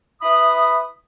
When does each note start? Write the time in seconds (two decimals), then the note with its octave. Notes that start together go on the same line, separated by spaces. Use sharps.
0.22 E4 B4 E5 B5 D#6